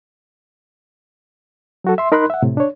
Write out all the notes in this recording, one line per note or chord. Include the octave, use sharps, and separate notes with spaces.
F#3 F#4 A4
E5 C6
D#4 A#4 B5 C6 F#6
E5 F#5
A2 C3
D4 C#5